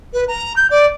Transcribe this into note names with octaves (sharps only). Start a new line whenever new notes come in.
B4
A#5
G6
D5